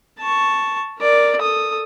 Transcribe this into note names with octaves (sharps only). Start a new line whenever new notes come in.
A5 C#6
A#4 D5
A4 D#6